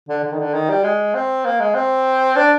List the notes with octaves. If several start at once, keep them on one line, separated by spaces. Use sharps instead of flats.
D3
D3
D#3
D3
D#3
G3
G#3
C4
A#3
G#3
C4
D4